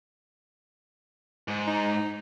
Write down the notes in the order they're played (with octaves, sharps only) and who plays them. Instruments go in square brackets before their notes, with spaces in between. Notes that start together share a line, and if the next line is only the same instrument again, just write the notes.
[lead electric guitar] G#2
[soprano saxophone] D#4